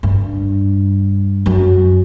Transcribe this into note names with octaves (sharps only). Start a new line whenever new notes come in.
G2
F#2